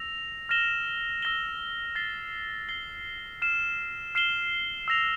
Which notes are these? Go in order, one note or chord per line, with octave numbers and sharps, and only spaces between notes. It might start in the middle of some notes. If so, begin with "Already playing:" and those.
Already playing: E6 A#6 F7
F6 A#6 E7 G7
E6 A#6 E7 G7
A6 C7 G7
A6 C7 G7
F6 C7 E7
F6 C7 E7 G7
E6 A#6 F7